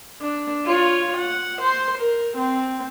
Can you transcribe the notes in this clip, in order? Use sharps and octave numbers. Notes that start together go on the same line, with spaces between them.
D4
F4 C#5
F#5
C5 C6
A#4
C4